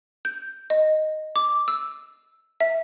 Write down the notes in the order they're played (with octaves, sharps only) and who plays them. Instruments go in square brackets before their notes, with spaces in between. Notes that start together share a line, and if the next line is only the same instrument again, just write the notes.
[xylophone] G6
D#5
D6
E6
E5